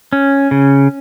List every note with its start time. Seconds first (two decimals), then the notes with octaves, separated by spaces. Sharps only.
0.13 C#4
0.51 C#3